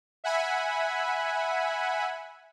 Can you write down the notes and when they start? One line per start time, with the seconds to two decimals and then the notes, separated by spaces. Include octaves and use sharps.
0.24 E5 F#5 G#5 B5